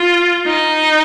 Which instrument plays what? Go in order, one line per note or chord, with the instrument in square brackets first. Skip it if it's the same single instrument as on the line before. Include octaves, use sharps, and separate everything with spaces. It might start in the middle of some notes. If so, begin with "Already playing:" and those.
Already playing: [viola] F4
D#4